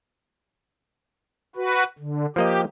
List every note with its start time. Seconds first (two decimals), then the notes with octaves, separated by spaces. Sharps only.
1.56 F#4 B4
1.98 D3
2.36 F3 A#3 G4 D#5